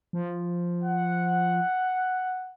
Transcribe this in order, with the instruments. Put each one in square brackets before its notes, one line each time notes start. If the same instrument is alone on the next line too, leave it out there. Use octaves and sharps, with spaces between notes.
[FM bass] F3
[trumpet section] F#5